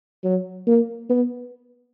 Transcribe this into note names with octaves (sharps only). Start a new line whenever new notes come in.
F#3
A#3
B3